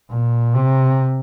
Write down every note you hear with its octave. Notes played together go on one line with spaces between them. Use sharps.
A#2
C3